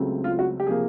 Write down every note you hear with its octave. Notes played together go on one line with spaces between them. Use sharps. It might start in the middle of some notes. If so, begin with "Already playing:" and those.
Already playing: C#2 C#3 F#3 A3 C4
F4
F#4
G4
C3 F3 A#3 G#4